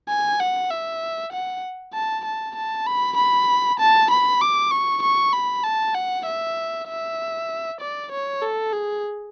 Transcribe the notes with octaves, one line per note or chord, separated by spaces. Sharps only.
G#5
F#5
E5
F#5
A5
A5
A5
B5
B5
A5
B5
D6
C#6
C#6
B5
A5
F#5
E5
E5
D5
C#5
A4
G#4